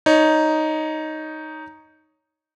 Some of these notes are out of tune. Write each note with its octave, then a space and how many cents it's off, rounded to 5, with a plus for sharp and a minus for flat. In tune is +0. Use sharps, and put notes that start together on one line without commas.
D#4 +0 C#5 +10